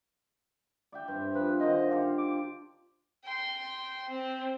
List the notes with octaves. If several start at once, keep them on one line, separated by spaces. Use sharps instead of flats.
D5 E5 G5
G2 C4
F3 B4
D3 D#3 C4 D#5
F4 G4 A4 F5
D6
G5 C6
C4